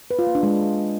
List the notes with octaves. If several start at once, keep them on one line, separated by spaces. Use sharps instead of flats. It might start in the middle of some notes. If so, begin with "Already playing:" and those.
B4
F4
A#3
D4
G#3